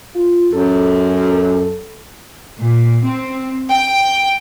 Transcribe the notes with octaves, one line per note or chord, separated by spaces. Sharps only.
F4
F#2 A4
A#2
C4
G5